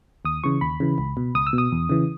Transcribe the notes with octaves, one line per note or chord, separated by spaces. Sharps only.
D#2 D#6
C#3 E3 C#6
D#2 B5
C#3 E3
C#2
B2
C#2 D#6
E6
B2
D#6
E2
C#3 E3